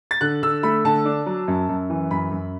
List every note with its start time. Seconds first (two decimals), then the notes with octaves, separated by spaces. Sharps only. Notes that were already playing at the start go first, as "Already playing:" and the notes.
0.11 A6
0.21 D3 F#6
0.43 D3 E6
0.63 A3 B5
0.85 D3 A5
1.05 D4
1.26 F#3
1.48 F#2
1.69 F#2
1.90 E3
2.11 F#2 B5
2.31 F#2